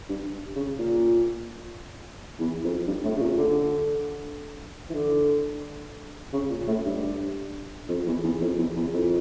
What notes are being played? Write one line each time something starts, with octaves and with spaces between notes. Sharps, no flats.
G2
C#3
A#2
E2
F2
G2
A2
C#3
A#2
D3
E3
D3
C#3
A#2
A2
G2
F2
E2
E2
F2
E2
E2
F2